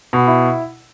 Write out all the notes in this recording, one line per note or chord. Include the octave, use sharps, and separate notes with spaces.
B2
E4